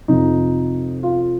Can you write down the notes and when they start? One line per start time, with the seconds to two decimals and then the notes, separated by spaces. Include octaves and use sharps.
0.08 F2 C3 F3 D#4
1.03 F4